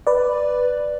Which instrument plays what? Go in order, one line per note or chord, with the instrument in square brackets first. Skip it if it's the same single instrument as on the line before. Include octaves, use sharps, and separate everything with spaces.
[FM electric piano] B4 D5